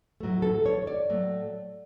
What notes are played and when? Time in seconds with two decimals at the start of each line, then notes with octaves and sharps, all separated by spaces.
0.20 A2 F#3 A3
0.42 A4
0.66 C#5
0.87 D5
1.09 A2 F#3 A3